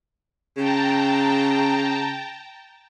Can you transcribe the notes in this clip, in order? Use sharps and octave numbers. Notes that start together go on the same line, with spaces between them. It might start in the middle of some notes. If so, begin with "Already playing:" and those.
C#3 G5 A5 A#5